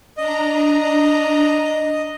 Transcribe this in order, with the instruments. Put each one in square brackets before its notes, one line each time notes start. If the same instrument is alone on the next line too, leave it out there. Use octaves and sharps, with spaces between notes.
[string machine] D4 A#5 [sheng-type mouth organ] D#5